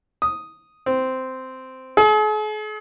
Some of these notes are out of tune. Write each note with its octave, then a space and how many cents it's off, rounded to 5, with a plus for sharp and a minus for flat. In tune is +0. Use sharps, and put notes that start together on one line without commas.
D#6 +0
C4 -10
G#4 +45